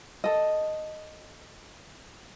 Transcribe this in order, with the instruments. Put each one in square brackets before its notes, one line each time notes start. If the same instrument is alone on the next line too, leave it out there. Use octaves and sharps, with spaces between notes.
[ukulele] A4 D#5